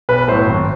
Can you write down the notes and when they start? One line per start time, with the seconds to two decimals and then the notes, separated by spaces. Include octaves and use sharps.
0.09 B1 B4
0.28 A2 F#3 C5
0.47 G#1